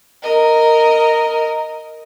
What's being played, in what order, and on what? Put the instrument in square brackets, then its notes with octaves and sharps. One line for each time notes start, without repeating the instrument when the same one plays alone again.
[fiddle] A#4 D#5